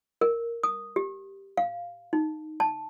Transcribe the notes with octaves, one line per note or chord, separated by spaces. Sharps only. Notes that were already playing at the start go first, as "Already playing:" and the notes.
A#4
D#6
G4
F5
D#4
A5